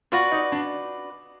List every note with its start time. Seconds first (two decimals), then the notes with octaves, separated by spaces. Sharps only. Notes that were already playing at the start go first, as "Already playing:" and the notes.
0.12 F4 F#4 B4 D5
0.32 D#4
0.52 D4